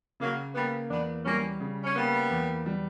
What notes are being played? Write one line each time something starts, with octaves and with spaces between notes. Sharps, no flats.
C#3 F#3 A#3
G3 A#3 B3
E2 B3 D4
G3 A#3 C#4
C#3
C#4
G3 A#3 B3
E2
G3